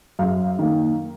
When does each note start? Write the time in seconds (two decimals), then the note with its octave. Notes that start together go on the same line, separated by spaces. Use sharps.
0.19 F#2 F5
0.59 D#3 A#3